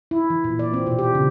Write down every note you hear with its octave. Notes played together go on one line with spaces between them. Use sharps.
E4
E3
A#2
D5
C4
B2
G4
C#3